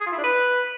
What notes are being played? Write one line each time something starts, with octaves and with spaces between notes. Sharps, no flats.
G#4
F4
E4
D4
B4